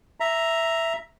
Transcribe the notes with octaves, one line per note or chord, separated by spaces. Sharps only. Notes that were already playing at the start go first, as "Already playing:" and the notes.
E5 A#5